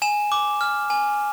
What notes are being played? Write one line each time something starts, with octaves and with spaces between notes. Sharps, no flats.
G#5 E7
D6
F6
G#5